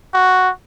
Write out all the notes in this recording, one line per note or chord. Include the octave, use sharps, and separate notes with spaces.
F#4